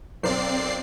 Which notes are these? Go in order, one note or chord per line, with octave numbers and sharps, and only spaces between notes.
B1 C4 A#4 C5 D5 C7